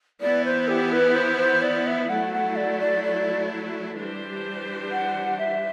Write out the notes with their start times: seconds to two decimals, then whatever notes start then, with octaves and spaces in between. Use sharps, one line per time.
0.21 E3 B3 E4 D5
0.45 C5
0.68 G4
0.92 B4
1.15 C5
1.38 C5
1.62 D5
1.86 E5
2.09 F#3 A3 E4 F#5
2.32 F#5
2.56 D5
2.79 D5
3.04 D5
3.97 E3 G3 D4 G4 C5
4.91 F#5
5.38 E5